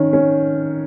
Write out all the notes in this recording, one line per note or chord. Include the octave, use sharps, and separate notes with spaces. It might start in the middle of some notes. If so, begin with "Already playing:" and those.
Already playing: D#3 C#4
C#4